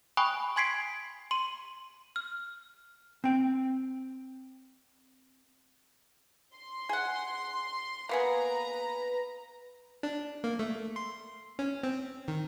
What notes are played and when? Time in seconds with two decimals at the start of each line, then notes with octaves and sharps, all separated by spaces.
0.17 G5 G#5 B5 C#6 D#6 F#6
0.56 G#5 C6 G#6 B6 C7 D7
1.31 C6 D#7
2.16 F6
3.24 C4 G5
6.56 C6
6.89 G#4 F#5
8.09 A#3 B3 G#4 B4 A#5
10.03 D4
10.44 A#3
10.59 A3
10.96 C6
11.59 C#4
11.83 C4
12.28 D#3